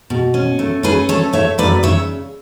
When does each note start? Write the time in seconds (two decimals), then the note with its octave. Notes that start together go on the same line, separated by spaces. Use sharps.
0.10 B2
0.34 C#4
0.59 A3
0.83 C#4 G#4 B4
1.09 A3 A4 C#5
1.33 A3 C#5 E5
1.58 F#2 B4 D5
1.83 C#3 C#5 E5